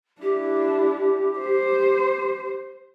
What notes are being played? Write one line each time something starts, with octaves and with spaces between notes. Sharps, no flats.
D4 E4 G4
C5